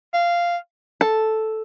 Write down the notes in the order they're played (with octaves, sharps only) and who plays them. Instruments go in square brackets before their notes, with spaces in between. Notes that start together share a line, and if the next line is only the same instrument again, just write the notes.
[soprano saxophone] F5
[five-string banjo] A4